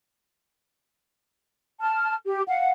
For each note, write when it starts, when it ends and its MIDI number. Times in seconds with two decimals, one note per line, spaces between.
1.81 2.14 81
1.81 2.14 89
2.26 2.42 67
2.47 2.72 77
2.47 2.72 78